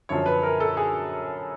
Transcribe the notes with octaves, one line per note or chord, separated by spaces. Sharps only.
F#2 D3 F3 C#5
B4
A#4
A4
G#4